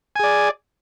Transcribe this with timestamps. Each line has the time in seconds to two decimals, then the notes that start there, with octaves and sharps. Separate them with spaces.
0.16 G#5
0.20 G#4
0.24 D5